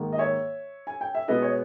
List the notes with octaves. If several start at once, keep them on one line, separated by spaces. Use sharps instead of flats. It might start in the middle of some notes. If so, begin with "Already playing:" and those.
Already playing: G#2 D#3 A#3
D#5
C#5 E5
G#5
G5
E5
B2 G#3 B3 B4 D#5
C#5